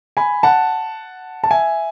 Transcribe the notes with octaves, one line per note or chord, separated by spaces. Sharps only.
G#5 B5
F#5 A5
A5
E5 G#5